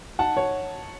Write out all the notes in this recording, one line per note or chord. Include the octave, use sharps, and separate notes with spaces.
D#4 F#5 A5
C#5